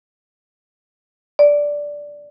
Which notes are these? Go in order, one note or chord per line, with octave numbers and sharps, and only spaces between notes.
D5